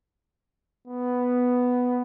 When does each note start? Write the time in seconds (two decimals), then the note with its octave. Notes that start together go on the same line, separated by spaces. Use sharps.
0.87 B3